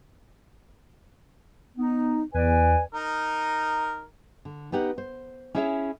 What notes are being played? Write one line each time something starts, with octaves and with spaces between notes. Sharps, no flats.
B3 D#4
E2 B4 D5 G#5
D#4 A#4
D3
B3 D#4 G4 F#5
C5
C#4 E4 G#4 C#5 D5 E5